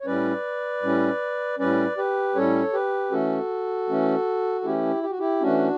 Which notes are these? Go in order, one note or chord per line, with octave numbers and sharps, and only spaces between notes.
C#5
A2 G3 C#4 B4 D5
A2 G3 C#4
A2 G3 C#4 B4 D5
G4 B4
A2 G3 C#4 A4 C#5
G4 B4
E3 A3 C#4 F#4 A4
E3 A3 C#4
A4
E3 A3 C#4 E4 G4
G4
F#4
E4 G4
E3 A3 C#4 D4 F#4